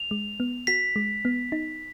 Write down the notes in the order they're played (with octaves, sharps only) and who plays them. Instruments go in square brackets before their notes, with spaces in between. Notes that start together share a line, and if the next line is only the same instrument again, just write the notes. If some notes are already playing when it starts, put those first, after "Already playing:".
Already playing: [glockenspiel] F7
[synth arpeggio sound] G#3
B3
[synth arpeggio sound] F#4 [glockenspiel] B6
[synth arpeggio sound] G#3
B3
D#4